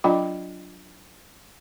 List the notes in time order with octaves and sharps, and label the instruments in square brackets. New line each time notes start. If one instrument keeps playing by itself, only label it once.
[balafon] F#3 D4 F4 D#5 G5 B5